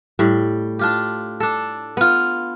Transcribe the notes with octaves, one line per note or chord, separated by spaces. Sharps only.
A2 G3
D4 F4 G4
D4 A4
B3 F4